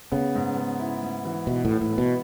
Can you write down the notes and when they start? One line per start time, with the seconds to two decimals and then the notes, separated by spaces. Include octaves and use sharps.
0.12 C#3 B3
0.35 G#2
0.57 B3
0.79 E4
1.03 G#2
1.25 E3
1.47 B2 E3
1.65 A2
1.71 E4
1.81 A2
1.93 B3
1.98 B2